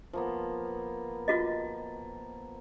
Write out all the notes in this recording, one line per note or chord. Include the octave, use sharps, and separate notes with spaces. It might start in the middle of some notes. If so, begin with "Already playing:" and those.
F3 A#3 B3
F4 F#4 D#5